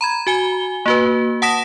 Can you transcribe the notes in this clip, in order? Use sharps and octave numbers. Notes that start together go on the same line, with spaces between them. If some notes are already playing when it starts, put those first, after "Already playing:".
A#5 B5 G#6
F#4 G#5 G7
A#3 F#4 B4
F#5 A5 D#6 A#6 B6 E7